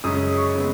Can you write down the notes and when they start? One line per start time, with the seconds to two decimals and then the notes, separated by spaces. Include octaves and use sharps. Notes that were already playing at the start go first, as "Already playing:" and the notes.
0.04 F#2 C#3 G#3 C#4 D#6
0.37 C#6
0.55 C#3 G#3 B3